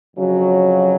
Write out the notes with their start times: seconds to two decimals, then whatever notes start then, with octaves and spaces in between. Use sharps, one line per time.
0.16 F2 C#3 F#3